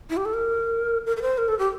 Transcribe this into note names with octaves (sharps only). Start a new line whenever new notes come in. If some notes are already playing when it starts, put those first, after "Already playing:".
E4
G4
A4
A#4
A#4
A#4
C5
A#4
A4
G4